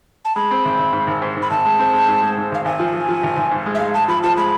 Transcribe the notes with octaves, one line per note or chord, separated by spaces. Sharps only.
A5
G#3 B5
C4
G#1
G#1
G#2
G#1
G#2
G#2
B5
G#1 A5
G#3
C4
G#3
G#2
G#3
G#2
G#1 F5
G#1 G#5
F3
F3
F3
G#1
G#1
G#2
G#3
E5
G#3 F5
G#3 A5
F3 B5
F3 A5
G#3 B5